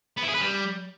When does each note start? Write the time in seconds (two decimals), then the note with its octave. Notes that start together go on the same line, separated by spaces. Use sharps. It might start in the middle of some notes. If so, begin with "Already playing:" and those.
0.17 B3
0.23 E4
0.29 G#4
0.35 B4
0.41 G3